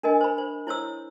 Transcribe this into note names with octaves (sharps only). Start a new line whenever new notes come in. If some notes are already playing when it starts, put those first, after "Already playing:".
D4 A#4 D#5 G#5
C5 B5
C5
E4 C5 C#5 E6